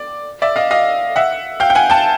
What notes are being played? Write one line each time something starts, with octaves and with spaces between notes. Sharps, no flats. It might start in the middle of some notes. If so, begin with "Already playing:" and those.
Already playing: D5
D5 E5
D#5 F5
D#5 F5
E5 F#5
F5 G5
G5
F#5 G#5
G5 A5